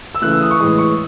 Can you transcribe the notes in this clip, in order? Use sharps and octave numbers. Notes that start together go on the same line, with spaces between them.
E6
C#3 E3 A3 F#6
E6
D#6
C#6
A2 E3 G#3 D#6
C#6